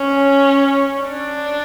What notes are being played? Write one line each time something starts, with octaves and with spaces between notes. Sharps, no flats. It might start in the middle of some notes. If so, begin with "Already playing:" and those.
Already playing: C#4
D4